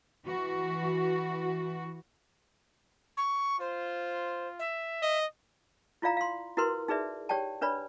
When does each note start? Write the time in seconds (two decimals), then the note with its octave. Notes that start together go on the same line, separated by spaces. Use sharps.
0.25 E3 F#4
3.17 C#6
3.60 F4 C5
4.59 E5
5.02 D#5
6.02 E4 F4 D5 F5 A#5
6.17 F5 C6
6.57 E4 F#4 A#4 B4 C6
6.88 D#4 G#4 B4 D5 E5
7.29 G4 C#5 D5 G5 A5
7.61 D4 B4 C#5 D5 B5